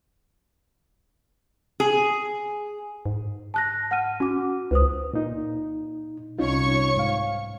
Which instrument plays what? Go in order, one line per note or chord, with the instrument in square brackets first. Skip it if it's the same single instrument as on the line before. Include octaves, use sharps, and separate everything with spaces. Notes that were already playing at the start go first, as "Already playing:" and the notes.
[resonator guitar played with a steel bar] G#4
[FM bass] G#2
[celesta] A5 F#6 A#6
F#5 F6 D#7
[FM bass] C#4 [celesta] F#4 D6
[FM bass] C#2 [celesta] B4 C5 D#6
[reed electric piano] A#2 D#4
[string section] C2 C#5 C#6 [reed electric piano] C#4 D#4 F4
[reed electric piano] G#2 F5